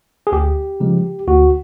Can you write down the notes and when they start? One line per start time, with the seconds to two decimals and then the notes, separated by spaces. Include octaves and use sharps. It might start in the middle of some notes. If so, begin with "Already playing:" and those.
0.27 G#4
0.32 D2 G4
0.80 C#3 F3 G#3
1.27 D2 F#4